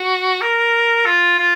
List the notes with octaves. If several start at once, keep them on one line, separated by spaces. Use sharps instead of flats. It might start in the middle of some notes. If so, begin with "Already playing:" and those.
Already playing: F#4
A#4
F4
F4